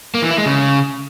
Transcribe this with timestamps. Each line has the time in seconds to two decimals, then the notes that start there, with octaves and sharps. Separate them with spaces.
0.14 A#3
0.22 E3
0.30 E4
0.38 G#3
0.46 C#3